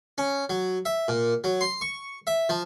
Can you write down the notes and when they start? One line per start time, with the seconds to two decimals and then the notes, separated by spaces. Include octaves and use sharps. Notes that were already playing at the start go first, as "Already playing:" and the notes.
0.18 C#4
0.49 F#3
0.85 E5
1.08 A#2
1.44 F#3
1.61 C6
1.81 C#6
2.27 E5
2.49 F3